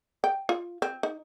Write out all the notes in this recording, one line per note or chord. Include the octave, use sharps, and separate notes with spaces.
G5
F4
C4
D#4